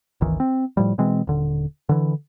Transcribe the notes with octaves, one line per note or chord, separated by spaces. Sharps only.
G1 C#2 D#3 E3
C4
A2 F3 G3
B2 E3 G#3 C4
D#1 D3
D3 E3